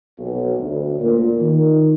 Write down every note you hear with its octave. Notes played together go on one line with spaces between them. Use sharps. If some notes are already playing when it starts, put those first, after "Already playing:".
B1
D2
A#2
D#3